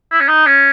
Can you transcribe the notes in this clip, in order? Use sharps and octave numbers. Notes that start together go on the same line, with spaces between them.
E4
C#4
D#4
C#4